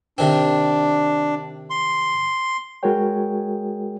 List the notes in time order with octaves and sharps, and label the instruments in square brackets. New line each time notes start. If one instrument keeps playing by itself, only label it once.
[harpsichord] C3 D#3 C4 [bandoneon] D4
[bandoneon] C6
[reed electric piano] G#3 F#4 G#4 A#4 C#5 G5